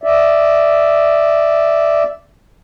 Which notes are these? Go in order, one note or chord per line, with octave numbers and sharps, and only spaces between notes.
D5 E5